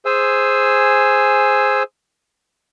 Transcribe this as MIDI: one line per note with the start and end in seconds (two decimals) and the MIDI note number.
0.06 1.83 68
0.06 1.83 72
0.06 1.83 80
0.06 1.83 88